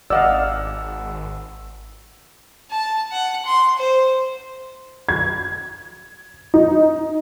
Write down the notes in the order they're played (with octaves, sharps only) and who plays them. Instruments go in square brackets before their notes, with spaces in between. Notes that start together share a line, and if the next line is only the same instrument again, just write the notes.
[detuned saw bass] G#1 [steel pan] D5 D#5 F5 [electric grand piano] F#5 E6
[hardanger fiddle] A5
F#5
C6
C5
[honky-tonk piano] G#6
D#4